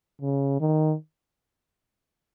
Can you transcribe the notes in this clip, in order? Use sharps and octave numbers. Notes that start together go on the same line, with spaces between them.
C#3
D#3